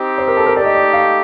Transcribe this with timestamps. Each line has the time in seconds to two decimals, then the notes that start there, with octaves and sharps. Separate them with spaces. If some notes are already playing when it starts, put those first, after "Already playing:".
Already playing: C4 D#4 G4
0.18 C5
0.28 A#4
0.37 A4
0.46 A#4
0.56 A3 D#4 G4 D5
0.65 D#5
0.75 D5
0.93 F5